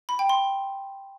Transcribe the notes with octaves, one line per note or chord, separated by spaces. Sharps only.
B5
G5
C6